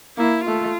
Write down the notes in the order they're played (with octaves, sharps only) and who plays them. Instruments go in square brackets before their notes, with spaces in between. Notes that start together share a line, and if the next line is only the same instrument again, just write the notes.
[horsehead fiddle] A#3 [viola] E4
[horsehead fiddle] A3 [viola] F4